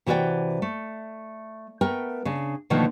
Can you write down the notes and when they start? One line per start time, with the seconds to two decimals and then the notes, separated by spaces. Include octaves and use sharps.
0.06 C3 E3 F#4 A#4 D5 G5
0.62 A3
1.81 A3 B3 A#4 G5
2.25 C#3 D4
2.70 B2 D3 D#3 F3 A3 A#3